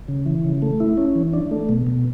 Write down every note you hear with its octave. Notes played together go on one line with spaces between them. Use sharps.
C#3
E3
C#3
A3
E4
C#4
E3
D4
A3
B2
B2